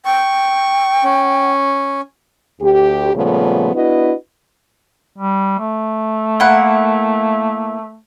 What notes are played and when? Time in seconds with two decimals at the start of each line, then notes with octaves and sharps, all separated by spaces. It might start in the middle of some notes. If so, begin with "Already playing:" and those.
0.05 G5 C#6
1.04 C#4
2.60 D2 G4
3.14 A#2 C#3 F3 G3 A3 B3
3.73 B3 D4 E4 F#4 B4 D#5
5.18 G3
5.59 A3
6.40 A#3 E4 F#5